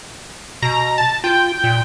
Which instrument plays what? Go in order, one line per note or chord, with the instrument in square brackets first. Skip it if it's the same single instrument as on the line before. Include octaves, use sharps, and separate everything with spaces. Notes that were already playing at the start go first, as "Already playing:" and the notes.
[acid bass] B2 [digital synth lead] A#5
[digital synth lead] A5
[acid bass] F4 [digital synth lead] G5
[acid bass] A#2